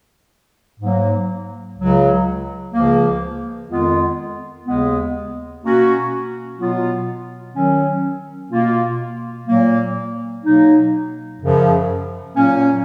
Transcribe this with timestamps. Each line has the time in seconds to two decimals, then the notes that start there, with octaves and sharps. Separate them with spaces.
0.80 G#2 F#3 A#3
1.77 C#2 C#3 F#3
2.73 C#2 C#3 F3 A#3
3.69 F2 D#3 G#3 B3 F4
4.66 D#2 C#3 G#3 B3
5.62 B2 A#3 C#4 F#4
6.58 B2 F#3 B3 F4
7.54 D#3 F#3 C#4
8.51 B2 A#3 F4
9.47 A#2 F#3 A#3
10.44 B2 F#3 A#3 D#4
11.40 F#2 C#3 F3
12.36 A#2 F#3 A#3 C#4